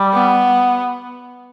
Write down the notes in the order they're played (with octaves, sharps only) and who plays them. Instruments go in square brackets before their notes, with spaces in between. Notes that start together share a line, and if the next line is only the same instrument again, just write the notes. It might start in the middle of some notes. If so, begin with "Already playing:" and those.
Already playing: [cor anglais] G3
[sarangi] B3